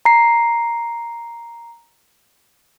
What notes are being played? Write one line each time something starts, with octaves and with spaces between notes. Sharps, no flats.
A#5 C7